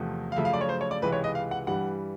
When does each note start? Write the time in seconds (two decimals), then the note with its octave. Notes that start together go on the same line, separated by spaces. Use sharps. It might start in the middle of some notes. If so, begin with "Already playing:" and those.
Already playing: E2 C3 F3 A3
0.32 F5
0.36 F#2 C#3 F3 A3 E5
0.45 F5
0.53 D5
0.61 C#5
0.69 C5
0.81 C#5
0.91 D5
1.02 C#2 C3 E3 G#3 B4
1.12 C#5
1.24 D#5
1.35 F5
1.51 F#5
1.67 G2 E3 G3 F#5